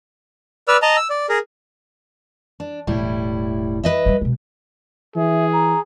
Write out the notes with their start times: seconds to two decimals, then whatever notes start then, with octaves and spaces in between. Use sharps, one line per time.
0.68 B4 D5 E6 F6
0.82 D#5 A5 A#5
0.97 E6
1.10 D5
1.29 G#4 A#4
2.60 D4
2.87 E1 A2 G3 E4
3.84 B4 D#5 E5
4.06 D#3 G3
4.21 B2 G#3
5.16 E3 G#4 E5
5.53 A#5